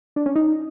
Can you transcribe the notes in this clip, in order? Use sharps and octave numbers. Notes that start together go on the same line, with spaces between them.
D4
C#4
D#4